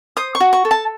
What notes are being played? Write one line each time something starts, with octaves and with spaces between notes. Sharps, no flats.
C5 D#6
C#6
F#4
C#6
A4
A5